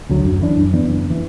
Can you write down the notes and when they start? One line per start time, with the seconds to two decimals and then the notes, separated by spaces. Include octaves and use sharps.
0.09 D2 D3 F#3
0.25 F#2
0.42 E3 D4
0.58 F#2
0.73 E3 B3 D4
0.90 F#1
1.10 E3